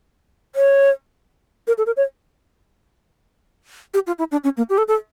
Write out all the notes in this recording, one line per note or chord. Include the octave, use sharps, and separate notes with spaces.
C#5
A#4
A4
A#4
C#5
G4
F4
E4
D4
C#4
A#3
G4
A4
A4